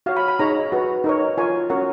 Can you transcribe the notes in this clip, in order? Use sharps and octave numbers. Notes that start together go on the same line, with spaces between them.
F#4 C#5 F5
B5
B5
D#4 G#4 C#5 A#5
F#4 B4
D#4 A#4 C#5
F4 A#4 C#5 G#5
C#4 F#4 A#4 C#5 F#5